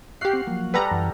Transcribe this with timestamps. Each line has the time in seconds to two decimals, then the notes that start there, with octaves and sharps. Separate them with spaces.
0.21 F#4 G4 F5 F#5 C7
0.33 C4
0.47 F3 F#3 A#3
0.74 G3 A4 B4 F#5 A#5
0.91 F#2 E3